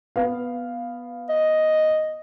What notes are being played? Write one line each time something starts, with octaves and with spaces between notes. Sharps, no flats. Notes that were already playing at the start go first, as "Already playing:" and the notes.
B3 F5
D#5